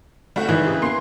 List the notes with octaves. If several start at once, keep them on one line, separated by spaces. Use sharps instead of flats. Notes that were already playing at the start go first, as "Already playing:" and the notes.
G3 A3 F#4
G#2 D#3 E3
C#3
A#3 C6 C7